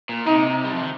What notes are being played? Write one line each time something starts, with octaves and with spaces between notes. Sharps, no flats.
A#2
C3 D#4
G3
F3
D#3